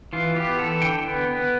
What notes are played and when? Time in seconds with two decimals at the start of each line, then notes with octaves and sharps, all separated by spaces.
0.13 E3 F4
0.36 B3 G4
0.59 E3 A4
0.82 D3 G5
1.05 B3
1.28 B3